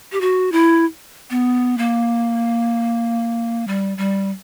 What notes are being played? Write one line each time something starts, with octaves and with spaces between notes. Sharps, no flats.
G4
F#4
E4
B3
A#3
G3
G3